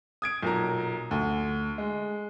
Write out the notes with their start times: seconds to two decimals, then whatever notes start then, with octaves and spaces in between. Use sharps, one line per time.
0.22 D#6 G#6 D7
0.42 B1 A#2 A#5
1.11 D2
1.78 G#3